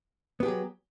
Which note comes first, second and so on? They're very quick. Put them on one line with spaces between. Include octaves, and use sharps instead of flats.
B3 G4 G#4 F#3